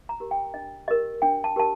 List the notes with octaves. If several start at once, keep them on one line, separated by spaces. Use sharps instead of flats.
A#5
G4 A#4
G5
D4 D#5
G4 A#4 D#5
D4 G5
A5
G4 A#4 A5